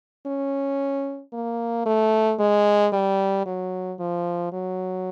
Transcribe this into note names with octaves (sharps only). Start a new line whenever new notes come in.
C#4
A#3
A3
G#3
G3
F#3
F3
F#3